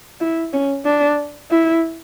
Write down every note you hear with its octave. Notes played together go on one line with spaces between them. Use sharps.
E4
C#4
D4
E4